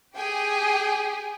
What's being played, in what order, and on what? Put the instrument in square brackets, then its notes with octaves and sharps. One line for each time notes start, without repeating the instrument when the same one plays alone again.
[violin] G4 G#4 [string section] G5 G#5